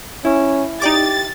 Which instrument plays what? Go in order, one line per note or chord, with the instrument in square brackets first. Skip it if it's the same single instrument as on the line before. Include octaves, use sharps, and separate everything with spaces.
[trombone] C#4 [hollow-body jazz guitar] E4
[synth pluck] D#4 D5 D6 [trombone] G4 [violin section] A6